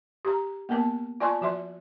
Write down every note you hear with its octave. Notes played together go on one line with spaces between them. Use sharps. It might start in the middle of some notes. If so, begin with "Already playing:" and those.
G4 A#5
A#3 B3 A#4 A5
F4 D5 G#5 A5 C6 C#6
F3 F#4 E5 C6